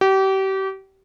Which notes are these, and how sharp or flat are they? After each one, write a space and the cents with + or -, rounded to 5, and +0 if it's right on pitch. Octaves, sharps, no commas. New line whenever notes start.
G4 -35